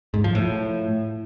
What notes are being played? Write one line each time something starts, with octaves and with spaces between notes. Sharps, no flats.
G#2
F3
A2